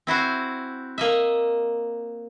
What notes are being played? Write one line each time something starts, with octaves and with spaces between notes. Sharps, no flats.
C4 E4 F#4 C5
A#3 D#5 E5